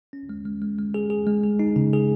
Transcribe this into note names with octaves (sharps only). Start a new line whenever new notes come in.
C#4
G#3
G#3
G#3
G#3
G#4
G#4
G#3
G#4
D#4
C#3
G#4